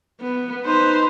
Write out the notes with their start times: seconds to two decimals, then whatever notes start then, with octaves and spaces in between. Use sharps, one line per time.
0.21 B3
0.66 D#4 B4 C5